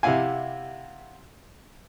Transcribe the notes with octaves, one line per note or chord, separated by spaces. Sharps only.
C3 E4 G4 F5 F#5 G#5